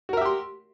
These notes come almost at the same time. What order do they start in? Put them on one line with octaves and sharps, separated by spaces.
F#4 A#4 E5 G4 C6